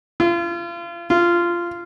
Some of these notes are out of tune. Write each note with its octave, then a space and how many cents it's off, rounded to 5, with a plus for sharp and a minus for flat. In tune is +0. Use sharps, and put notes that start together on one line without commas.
F4 -35
F4 -15